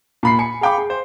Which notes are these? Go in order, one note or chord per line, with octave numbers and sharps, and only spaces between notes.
A#2 B5 C7
G#5 B5 C#7
G#4 F5 G5 B5 D6
G#4
C5